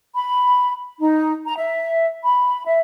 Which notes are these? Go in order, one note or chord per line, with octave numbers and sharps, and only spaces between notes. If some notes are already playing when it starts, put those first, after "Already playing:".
B5
D#4
A#5
E5
B5
E5